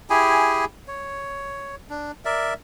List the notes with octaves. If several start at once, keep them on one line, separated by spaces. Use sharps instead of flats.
E4 G4 G#4 G#5
C#5
D4
A#4 D5 E5